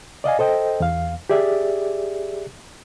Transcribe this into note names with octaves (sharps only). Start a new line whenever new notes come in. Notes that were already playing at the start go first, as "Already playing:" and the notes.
D5 D#5 F5 G#5
A4 C5 D#5 G5
E2 F5
G4 G#4 D5 E5